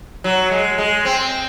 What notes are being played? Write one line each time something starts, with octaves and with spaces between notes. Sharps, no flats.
F#3
G#3
G#3
C4